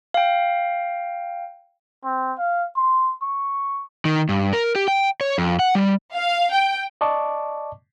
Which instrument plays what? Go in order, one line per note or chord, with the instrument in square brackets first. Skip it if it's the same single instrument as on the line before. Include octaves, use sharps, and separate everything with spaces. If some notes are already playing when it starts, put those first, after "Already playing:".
[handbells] F5 G5
[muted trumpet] C4
F5
C6
C#6
[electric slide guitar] D#3
G2
A#4
G4
G5
C#5
F2
F#5
G3
[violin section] F5
G5
[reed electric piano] D5 D#5 A5 C#6 D6